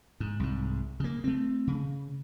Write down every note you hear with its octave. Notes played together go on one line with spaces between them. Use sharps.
G#2
C2 G#2
C#3 A#3
A3 C4
C#3